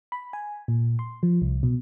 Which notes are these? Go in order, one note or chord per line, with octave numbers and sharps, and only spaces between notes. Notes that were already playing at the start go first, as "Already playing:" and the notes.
B5
G#5
A#2
C6
F3
C2
B2